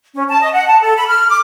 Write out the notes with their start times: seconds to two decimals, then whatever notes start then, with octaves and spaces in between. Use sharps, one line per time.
0.14 C#4
0.29 A5
0.41 D#5
0.53 F#5
0.67 A5
0.81 A4
0.96 B5
1.08 F6
1.29 D6